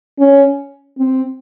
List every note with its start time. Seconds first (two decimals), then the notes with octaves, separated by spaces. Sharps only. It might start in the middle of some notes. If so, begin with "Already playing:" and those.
0.19 C#4
0.98 C4